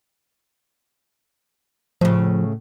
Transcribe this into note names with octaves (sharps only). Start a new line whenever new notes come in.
A2 C#3 F3